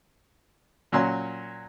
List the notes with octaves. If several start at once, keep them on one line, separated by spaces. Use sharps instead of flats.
A#2 F#3 C#4 C6